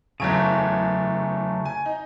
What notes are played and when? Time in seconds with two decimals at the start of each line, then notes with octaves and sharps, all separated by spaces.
0.20 F#1 E2 C#3 F#3 A3 D7
1.65 G#5
1.86 D#4